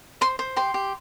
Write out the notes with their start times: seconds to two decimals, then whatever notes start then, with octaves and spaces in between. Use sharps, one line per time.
0.21 C5 C6
0.39 C5
0.56 G4 C6
0.74 G4